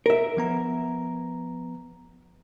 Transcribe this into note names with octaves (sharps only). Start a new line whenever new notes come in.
A#4 E5
F3 B3 A#5